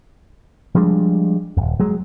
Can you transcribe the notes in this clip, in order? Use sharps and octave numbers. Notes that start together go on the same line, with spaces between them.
F3 G3 G#3 D4
D#1 F2
F#3 G#3